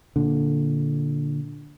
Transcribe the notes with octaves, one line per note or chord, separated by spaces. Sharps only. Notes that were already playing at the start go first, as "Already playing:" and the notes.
A#2 D3